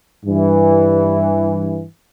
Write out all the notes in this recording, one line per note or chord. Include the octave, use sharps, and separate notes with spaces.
G2 E3